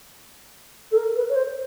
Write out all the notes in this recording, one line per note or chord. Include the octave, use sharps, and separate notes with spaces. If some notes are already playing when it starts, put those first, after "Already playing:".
A4
A#4
B4
C#5
C5